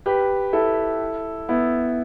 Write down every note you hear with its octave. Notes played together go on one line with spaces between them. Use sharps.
G4 B4
E4 A4
B3 E4